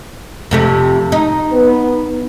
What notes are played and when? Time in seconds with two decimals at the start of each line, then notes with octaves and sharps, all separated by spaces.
0.51 F2 C3 A3
1.12 D#4
1.52 B3 B4